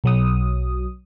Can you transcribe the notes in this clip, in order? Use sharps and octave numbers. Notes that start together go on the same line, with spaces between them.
B1 F#3 D#6